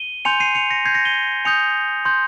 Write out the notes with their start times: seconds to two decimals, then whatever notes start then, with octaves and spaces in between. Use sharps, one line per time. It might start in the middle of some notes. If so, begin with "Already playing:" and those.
Already playing: D#7 G7
0.25 G#5 C6 G6 C#7 F7
0.40 C7 D#7
0.55 C#7 F7
0.70 A#6 C#7
0.85 C6 G6 G#6 C7
0.95 A#6 C#7
1.05 D#7 G7
1.45 G#5 D#6 G6 C#7 F7
2.05 C6 G6